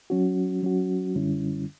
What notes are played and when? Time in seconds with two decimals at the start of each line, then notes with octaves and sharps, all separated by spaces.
0.10 F#3 C#4 F#4
0.63 F#3 C#4 F#4
1.15 F#2 D3 G3 C#4 E4